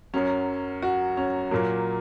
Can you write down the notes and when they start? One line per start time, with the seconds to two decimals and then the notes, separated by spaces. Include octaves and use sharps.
0.13 F#2 F#3 C#4
0.82 F#4
1.17 C#4
1.51 A#2 F#3 A#3